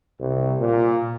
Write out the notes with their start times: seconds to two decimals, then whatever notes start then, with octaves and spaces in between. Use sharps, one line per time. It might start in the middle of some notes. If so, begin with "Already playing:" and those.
0.20 C2
0.60 A#2